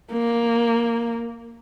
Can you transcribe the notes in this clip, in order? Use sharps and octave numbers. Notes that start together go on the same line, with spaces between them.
A#3